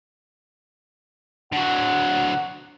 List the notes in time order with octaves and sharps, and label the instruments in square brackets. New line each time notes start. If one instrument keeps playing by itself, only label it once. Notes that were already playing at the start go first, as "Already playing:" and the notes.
[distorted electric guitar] D3 F#3 [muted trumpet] F#5